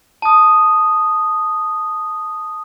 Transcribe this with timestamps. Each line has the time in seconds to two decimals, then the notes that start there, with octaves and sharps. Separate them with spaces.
0.22 A5 D#6